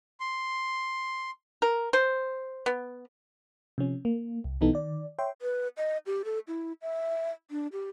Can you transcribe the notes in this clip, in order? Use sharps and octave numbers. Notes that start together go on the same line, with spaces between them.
C6
A#4
C5
B3
C3 F3 C#4
A#3
C2
B1 E3 B3 D#4 A4
D#3 D5
C#5 E5 G5 C6
B4
D#5
G4
A4
E4
E5
D4
G4